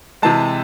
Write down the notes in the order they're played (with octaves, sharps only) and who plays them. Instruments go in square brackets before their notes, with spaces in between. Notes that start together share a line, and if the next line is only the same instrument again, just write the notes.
[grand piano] C3 E3 G#3 A5